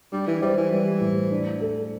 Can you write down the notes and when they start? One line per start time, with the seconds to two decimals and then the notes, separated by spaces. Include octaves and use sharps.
0.12 G3 D4
0.27 E3
0.42 G3 C5
0.57 E3
0.71 E3 G3
1.01 A2
1.30 D4
1.60 A4